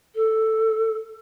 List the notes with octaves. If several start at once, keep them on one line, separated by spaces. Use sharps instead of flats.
A4